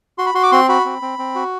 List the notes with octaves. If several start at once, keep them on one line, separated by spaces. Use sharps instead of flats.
F#4 C6
B5
F#4 C6
D6
C4 C6
F#4 B5
C4
C4
C4
F#4